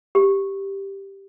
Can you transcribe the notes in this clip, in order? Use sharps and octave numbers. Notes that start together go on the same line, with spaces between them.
G4